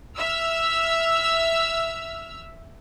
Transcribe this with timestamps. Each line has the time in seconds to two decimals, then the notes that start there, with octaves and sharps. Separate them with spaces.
0.17 E5 E6 F6